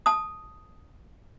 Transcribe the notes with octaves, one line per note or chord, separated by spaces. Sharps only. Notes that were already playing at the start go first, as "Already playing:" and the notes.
A5 D#6